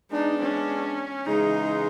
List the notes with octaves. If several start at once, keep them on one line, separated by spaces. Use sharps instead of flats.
G#3 B3 D4 D#4
C#4
C#3 E3 G#3 D#4